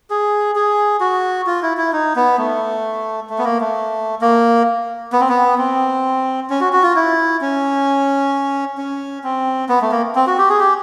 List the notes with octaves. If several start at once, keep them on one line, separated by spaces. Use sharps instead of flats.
G#4
G#4
F#4
F4
E4
E4
D#4
B3
A3
A3
B3
A#3
A3
A#3
B3
C4
B3
C4
C#4
F#4
F#4
F4
E4
C#4
C#4
C4
B3
A3
A#3
C4
F#4
G4
G#4
G4